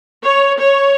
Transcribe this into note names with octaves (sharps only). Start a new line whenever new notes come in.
C#5
C#5